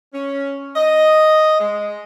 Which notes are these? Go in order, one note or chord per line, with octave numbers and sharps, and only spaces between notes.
C#4
D#5
G#3